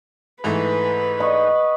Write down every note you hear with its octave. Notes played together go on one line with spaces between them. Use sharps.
G#2 E3 A3 B4
D#5 F#5 C#6